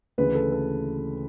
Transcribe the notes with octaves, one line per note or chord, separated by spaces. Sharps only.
D2 C#3 E3 B4
A4
A4